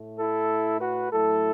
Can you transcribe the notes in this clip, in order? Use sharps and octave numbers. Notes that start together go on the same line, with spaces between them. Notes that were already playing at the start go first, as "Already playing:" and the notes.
Already playing: A2 A3
E4 A4
F#4 B4
A2 F#3 A3 E4 A4